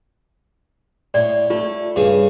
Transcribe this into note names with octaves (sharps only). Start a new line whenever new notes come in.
A2 D5
A3 F4
G2 C#3 G#4